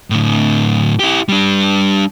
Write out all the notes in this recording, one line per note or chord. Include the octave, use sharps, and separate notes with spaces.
A2 D3
E4 G4
G3 D4